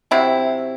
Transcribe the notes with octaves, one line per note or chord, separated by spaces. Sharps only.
C3 F#3 C4 E4